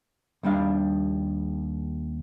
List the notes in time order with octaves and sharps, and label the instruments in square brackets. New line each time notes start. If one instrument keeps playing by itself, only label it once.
[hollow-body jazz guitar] D#2 G3 D4 F5